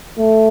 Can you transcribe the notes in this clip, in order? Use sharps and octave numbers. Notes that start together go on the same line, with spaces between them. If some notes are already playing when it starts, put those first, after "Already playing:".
A3